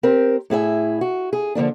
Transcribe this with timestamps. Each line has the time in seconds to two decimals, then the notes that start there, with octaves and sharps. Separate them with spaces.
0.03 C4 G4 A#4
0.50 A2 E4 G#4 E5
1.01 F#4
1.33 G#4
1.55 D3 F3 A#3 D4